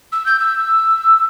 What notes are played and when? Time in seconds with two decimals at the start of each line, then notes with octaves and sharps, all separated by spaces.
0.12 E6
0.26 G6
0.39 E6